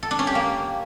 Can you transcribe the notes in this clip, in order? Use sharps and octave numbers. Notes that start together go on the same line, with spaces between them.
A4
D4
C#4
G4
A#3